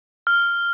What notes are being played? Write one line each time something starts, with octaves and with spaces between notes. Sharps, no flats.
F6